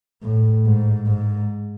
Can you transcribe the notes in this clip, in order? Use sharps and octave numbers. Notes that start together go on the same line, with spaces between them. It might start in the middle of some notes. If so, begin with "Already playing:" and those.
A2
G#2
G#2